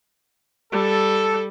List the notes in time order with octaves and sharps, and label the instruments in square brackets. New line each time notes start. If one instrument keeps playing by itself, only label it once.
[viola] G3 [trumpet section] A4